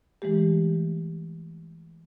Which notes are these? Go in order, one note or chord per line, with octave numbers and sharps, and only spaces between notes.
E3 G#3 A3 G4